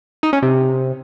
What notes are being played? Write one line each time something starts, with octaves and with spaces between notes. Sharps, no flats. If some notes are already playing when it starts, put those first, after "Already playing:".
D#4
C#4
C3